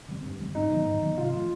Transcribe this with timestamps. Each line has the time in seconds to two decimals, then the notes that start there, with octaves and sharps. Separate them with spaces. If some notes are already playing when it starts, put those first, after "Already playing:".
0.08 D3 G3 C4
0.24 G2
0.40 D3 G3 C4
0.55 G#2 D#4
0.71 D#3 F#3 B3
0.86 G#2
1.02 D#3 F#3 B3
1.17 C3 F4
1.33 F3 A3